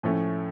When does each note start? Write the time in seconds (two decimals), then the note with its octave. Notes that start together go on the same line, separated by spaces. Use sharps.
0.03 A2 F3 A3 C#4